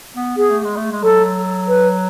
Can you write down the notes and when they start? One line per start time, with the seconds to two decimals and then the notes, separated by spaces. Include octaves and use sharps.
0.16 B3
0.37 B3 G#4
0.50 A3
0.64 G#3
0.76 A3
0.91 G#3
1.03 F#3 A4
1.68 B4